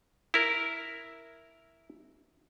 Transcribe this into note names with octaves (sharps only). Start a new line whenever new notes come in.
E4 A#4